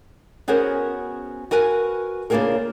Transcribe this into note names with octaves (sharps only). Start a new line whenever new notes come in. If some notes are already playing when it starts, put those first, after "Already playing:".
B3 C#4 F#4 G#4 A#4 C5
F#4 A#4 B4 G#5
C#3 A#3 D4 F4 G#4 A#4